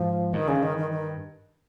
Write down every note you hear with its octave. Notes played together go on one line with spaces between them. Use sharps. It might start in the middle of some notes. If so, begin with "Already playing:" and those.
Already playing: G#2 F3
G2 D#3
C#3
D#3
D#3
D#3